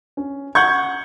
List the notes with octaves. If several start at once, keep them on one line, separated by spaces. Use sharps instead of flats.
C#4
F#5 C#6 G6 G#6